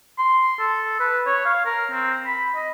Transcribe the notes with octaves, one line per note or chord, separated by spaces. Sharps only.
C6
A4
B4
C#5
F5
A#4
C4
B5
D#5